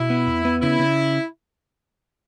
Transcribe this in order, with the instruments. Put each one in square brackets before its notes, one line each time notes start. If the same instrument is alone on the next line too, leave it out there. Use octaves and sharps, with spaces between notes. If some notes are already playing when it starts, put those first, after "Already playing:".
Already playing: [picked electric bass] B2 [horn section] E4
[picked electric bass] B3
E2
B3
[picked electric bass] C#3 [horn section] E4
[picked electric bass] C#3